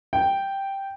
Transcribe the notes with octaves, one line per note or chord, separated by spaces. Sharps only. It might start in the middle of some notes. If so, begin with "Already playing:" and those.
G5